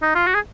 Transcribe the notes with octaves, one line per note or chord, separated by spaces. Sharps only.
D#4
F4
F#4
G#4